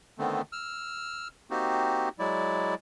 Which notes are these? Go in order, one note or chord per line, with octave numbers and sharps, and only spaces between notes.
D3 D#3 A3 B3 C4
E6 F6
A#3 C4 D#4 F#4 G4
F#3 G#3 E4 D5